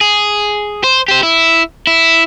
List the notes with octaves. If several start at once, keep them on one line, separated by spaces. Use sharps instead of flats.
G#4
C5
G4 C5
E4
E4